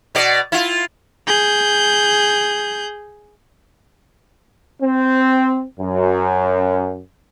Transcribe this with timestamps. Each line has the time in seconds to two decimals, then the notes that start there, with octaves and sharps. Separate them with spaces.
0.15 B2 D5
0.52 E4 F4
1.27 G#4 G6
4.82 C4
5.79 F#2